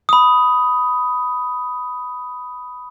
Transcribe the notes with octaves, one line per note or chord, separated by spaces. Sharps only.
B5 D#6